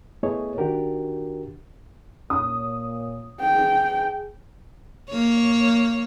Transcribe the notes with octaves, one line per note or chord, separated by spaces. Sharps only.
A3 B3 E4 G#4 C#5 D#5
D#3 D4 F#4 G4 A#4
A#2 C#5 D#6
G#4 G5
A#3 C#5